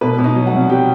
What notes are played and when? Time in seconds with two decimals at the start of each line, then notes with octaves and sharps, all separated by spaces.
0.01 B2 B4
0.19 B2
0.24 D#4 D#5
0.36 F#3
0.47 F#4 F#5
0.53 C2
0.69 F#3 G4 G5